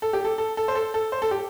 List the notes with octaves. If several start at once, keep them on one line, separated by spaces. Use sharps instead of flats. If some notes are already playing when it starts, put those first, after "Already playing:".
A4
G4
A4
A4
A4
C5
A4
A4
C5
A4
G4